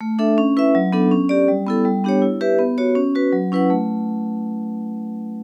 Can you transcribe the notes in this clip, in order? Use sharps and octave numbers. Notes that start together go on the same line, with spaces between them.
A3
D4 A4 E5
C#4
E4 B4 E5
F#3
B3 D4 A4
C#4
G4 D5
G3
B3 E4 A4
G3
B3 D4 G4 C#5
E4
G4 B4 E5
B3
F#4 C#5
C#4
F#4 B4
F#3
C#4 E4 B4 F#5
A3